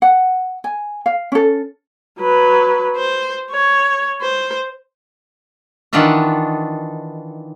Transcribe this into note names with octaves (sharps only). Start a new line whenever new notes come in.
F#5
G#5
F5
C#4 A4
F#3 B4
C5
C#5
C5
D#3 E3 D4 F4 E5 F#5